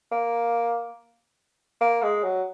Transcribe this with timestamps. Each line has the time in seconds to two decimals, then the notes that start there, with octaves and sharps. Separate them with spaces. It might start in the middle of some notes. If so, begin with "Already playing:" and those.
0.12 A#3
1.81 A#3
2.03 G#3
2.24 F#3